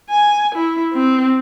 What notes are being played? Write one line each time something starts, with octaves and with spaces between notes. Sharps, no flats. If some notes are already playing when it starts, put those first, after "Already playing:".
G#5
E4
C4